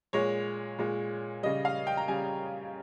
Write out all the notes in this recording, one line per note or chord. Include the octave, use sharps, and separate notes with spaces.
A#2 G#3 C#5
A#2 G#3
C#3 G3 D#5
F5
G5
A#5
C#3 G3 G#5